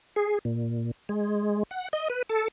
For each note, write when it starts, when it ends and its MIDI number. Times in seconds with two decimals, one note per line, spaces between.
0.16 0.39 68
0.45 0.91 46
1.09 1.63 56
1.71 1.88 78
1.93 2.08 75
2.10 2.22 71
2.30 2.48 69